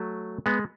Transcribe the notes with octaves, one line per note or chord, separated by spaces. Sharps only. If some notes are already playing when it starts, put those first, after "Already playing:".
Already playing: F#3 A3
G#3 B3